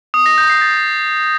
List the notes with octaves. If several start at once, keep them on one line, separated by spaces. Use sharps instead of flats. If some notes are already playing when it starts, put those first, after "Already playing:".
D#6
A#6
G6
C7
A6